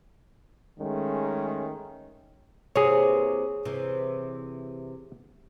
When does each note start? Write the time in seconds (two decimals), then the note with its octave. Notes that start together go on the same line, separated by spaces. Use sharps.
0.78 D#3 G#3 A3 C#4
2.76 C3 E3 A#3 G#4 C#5
3.65 C3 E3